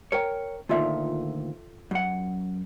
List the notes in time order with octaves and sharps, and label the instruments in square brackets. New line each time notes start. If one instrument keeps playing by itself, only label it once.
[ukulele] A#4 G5 [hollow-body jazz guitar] C#5
[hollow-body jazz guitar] D2 A#2 D#3 [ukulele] F4 A4 E5
[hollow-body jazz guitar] F#2 F#5